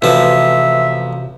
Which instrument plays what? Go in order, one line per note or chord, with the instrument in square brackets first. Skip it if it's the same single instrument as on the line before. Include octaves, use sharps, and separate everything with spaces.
[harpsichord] A1 F3 [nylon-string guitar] C3 F#4 B4 [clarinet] E5